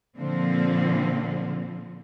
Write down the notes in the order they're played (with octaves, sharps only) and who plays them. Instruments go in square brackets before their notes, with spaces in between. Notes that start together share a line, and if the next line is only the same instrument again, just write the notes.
[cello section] A#2 D3 F3 C4